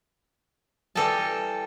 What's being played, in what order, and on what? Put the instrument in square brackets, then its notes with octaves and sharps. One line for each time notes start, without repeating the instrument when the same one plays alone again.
[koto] E3 G3 A4 D#5 G5 A5